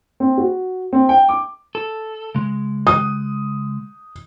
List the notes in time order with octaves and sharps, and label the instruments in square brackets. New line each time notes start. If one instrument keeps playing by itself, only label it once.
[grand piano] C4
F#4
C4
G5
D6
[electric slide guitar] A4
C#3 G#3
[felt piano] D#6